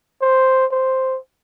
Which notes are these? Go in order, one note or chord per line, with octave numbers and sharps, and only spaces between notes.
C5
C5